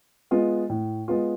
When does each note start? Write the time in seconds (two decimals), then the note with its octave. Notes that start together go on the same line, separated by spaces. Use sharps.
0.31 G#3 B3 F4
0.69 A2
1.08 G#3 B3 F4